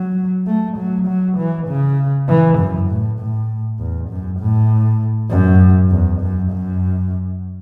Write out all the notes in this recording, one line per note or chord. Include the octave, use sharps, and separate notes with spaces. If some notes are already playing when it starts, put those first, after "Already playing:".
Already playing: F#3
A3
F#3
F#3
E3
C#3
E3
F#2
A2
A2
E2
F#2
A2
F#2
E2
F#2
F#2